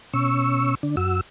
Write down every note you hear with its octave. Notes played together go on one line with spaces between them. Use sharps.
B2 C#4 C#6 E6
D3 D4
F#2 F#4 E6